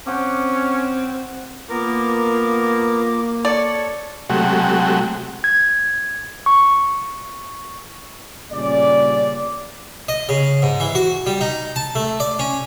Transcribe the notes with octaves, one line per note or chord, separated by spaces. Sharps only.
C4 C#4 C5 F#5 D6
A#3 B3 F4 A#4 D6
A4 C#5 D5
C3 F#3 G#3 A3 F#4 G4
G#6
C#6
G1 A#2 C#3 G3 C#4 D5
D#5
C#3
G#2
E3
F#4
G3
D#4
A5
A3
D5
C#4